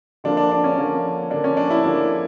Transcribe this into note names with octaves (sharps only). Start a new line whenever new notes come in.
D3 F3 A#3 D4
D4
D4
C#4
D3 F3 A#3
D3 F3 A#3 D4
C#4
D4
E4
D3 F3 A#3 D4